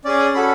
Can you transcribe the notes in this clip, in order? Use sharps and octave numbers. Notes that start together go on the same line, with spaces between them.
C#4 G#4 D5
C#4 F#4 A4 B5